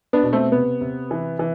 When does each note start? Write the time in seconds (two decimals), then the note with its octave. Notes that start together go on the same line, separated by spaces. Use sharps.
0.13 B3 D4
0.23 B2
0.33 A3 C4
0.52 C3 B3
0.81 C3
1.11 E3
1.39 E3